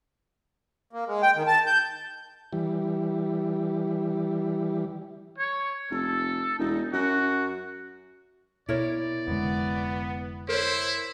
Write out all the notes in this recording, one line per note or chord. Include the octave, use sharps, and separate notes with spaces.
A#3
G#3
G5
D#3
A5
G6
E3 G3
C#5
F1 A4
E1 D#4
F#2 F#4
B2 E4 A#4 C#5 D5
F1 D3 G#3 B3
E4 A#4 C5 C#5